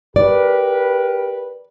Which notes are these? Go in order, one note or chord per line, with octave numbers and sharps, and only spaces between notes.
G4 A#4 B4 D5